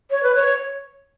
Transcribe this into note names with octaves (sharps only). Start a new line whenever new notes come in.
C#5
B4
C#5